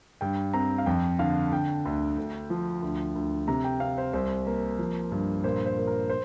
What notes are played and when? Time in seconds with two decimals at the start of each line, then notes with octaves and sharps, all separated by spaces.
0.21 G2 G5
0.53 C4 A#5
0.78 F5
0.86 F2 G5
1.19 D3 F5
1.52 D3 G5
1.85 D2
2.18 D2
2.50 F3
2.82 D2
3.15 D2
3.48 C3 A#5
3.64 G5
3.80 C4 F5
3.98 C5
4.13 C2 C5
4.47 A#3
4.79 F3
5.12 G2
5.44 A#2 C5
5.66 C5
5.77 A#2
5.87 A#4
6.09 C5